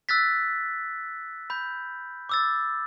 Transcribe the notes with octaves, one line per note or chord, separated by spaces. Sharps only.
E6 F#6 A6 B6
B5 G6
D6 E6 A6